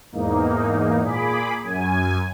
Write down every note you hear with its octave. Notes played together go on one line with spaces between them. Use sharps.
E2 G#2 A#3 D#4
A#2 G#4 B5 D6
F#2 G#5